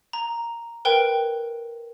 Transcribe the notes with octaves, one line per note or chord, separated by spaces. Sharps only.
A#5
A#4 B4 G5